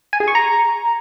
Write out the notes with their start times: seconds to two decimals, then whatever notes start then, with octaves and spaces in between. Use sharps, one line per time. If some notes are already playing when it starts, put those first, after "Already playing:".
0.13 G#5
0.20 G#4
0.28 C#6
0.35 A#5